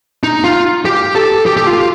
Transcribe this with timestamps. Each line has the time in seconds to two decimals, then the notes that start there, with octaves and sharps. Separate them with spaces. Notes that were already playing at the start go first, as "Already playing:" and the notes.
0.23 D#4
0.44 F4
0.85 G4
1.15 A4
1.46 G4
1.57 G4
1.67 F4